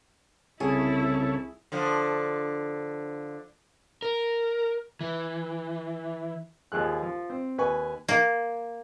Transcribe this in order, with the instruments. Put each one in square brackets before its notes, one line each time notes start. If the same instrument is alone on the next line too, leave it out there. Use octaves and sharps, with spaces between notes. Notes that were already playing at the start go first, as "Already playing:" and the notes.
[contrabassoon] C2 [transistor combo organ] C#3 A4 C#5 [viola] E4 [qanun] G#4
[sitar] D3 F3
[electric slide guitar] A#4
E3
[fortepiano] D#2 F3 G#3 F#6
F3
C4
D#2 B4 G#5 C#6
[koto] A#3